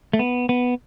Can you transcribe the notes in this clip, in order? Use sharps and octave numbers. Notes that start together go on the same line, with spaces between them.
A3
B3
B3